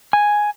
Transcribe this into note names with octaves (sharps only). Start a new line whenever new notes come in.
G#5